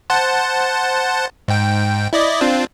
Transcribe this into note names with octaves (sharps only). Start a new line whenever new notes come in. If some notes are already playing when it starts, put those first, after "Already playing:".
C5 F#5 A5
G#2 G5
E4 D5 D#5
C4 D4 F4